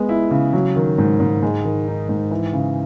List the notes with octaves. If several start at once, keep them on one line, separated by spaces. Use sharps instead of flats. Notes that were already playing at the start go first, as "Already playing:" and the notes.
Already playing: G#3 B3
E4
C#3
F#3
D#3
G#2
G#2
G#3
D#3
D#4
G#2
E3
C#3